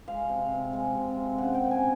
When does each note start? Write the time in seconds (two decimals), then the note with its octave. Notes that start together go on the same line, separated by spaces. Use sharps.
0.08 G#3 F5
0.29 C3
0.52 C3
0.73 G#3
0.94 C3
1.17 C3
1.38 C#3 F#5
1.54 G5
1.60 A#3
1.71 G#5